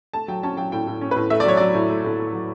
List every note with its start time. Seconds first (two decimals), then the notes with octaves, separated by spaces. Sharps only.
0.14 A3 A5
0.28 F#3 G5
0.43 C#4 A5
0.57 F#3 G5
0.72 A2 G5
0.87 A2
1.01 C#4
1.11 A2 B4
1.30 A3 E5
1.40 D5
1.45 F#3 C#5
1.57 F#3 D5
1.74 A2
1.89 A3
2.04 A2
2.19 A2
2.33 F#3